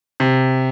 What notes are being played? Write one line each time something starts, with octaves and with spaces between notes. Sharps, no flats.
C3